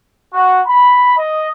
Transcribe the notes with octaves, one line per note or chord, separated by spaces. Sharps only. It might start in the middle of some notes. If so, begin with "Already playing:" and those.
F#4
B5
D#5